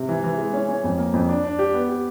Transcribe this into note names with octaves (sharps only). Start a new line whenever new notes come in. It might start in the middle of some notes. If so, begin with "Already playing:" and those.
Already playing: C3
E3
E3
G#3
C#4
C#4
F2
A#3
F2
D4
D4
G4
B3
G4